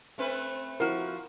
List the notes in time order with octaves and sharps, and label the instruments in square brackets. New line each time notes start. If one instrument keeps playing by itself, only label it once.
[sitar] A3 C4 B4
[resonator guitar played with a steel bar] F3 F#4 [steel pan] E4 A#4